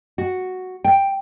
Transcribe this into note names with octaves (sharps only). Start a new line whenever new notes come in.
F#4
G5